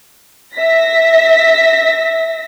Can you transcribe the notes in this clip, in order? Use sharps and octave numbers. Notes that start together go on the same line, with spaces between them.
E5 A#6 B6